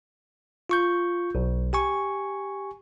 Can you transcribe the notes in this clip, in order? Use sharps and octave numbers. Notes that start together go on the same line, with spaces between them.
F4 C#6 G6
B1
G4 G#5 C#6